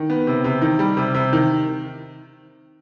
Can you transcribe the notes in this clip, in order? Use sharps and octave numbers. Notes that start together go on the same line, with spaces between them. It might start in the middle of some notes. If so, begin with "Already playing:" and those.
Already playing: D#3
B3
C3
C3
D#3
G3
C3
C3
D#3